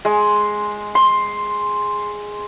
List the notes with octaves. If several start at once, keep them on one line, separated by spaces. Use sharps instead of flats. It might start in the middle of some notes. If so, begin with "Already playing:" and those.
G#3
C6